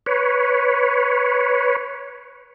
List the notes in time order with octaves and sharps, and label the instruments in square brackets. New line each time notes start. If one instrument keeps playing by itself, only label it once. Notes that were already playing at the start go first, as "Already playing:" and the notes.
[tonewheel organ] B4 C#5